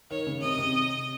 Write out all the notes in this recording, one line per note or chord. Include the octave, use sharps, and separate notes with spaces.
D#3 C#5
C#3
C3 D#5
C3
C3